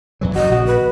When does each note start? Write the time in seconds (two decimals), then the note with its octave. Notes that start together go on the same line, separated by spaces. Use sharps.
0.21 E2 E3 F#3
0.35 F#1 F#2 F#4 D#5
0.51 A#1 C#3 F#4
0.67 B4